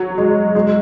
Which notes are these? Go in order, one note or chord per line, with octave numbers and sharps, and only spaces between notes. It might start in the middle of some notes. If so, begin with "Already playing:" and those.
Already playing: F#3
G#3
G#3